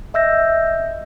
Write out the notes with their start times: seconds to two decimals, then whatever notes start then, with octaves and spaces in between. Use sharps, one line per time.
0.14 D#5 E5 E6 G6 A#6